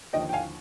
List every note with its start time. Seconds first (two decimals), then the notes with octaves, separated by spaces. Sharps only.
0.13 D#2 D3 F3 D#5 G5
0.29 G5
0.33 F5 G#5